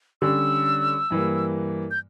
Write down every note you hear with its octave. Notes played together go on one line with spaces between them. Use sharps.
D3 G3 C#4 E6
G2 E3 A#3
G6